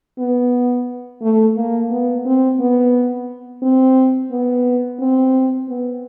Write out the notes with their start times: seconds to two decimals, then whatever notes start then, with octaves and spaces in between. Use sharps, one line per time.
0.19 B3
1.22 A3
1.56 A#3
1.90 B3
2.25 C4
2.59 B3
3.63 C4
4.31 B3
5.00 C4
5.69 B3